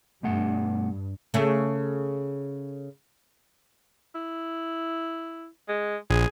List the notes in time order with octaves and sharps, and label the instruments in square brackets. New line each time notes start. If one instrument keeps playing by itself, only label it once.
[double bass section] G2 [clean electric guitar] B2 A3 F#5
[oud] C#3 A3
[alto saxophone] E4
G#3
[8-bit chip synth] A#1 [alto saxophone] G#4